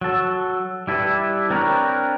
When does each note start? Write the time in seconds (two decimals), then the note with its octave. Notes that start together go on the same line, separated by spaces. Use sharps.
0.01 F#3 A4
0.87 G3 E4 A4 B4
1.50 C4 D4 A#4 B4 C#5